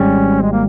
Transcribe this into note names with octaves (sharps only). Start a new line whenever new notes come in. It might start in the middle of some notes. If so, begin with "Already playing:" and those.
Already playing: G#1 G#2 G3 C#4
G#3
A#3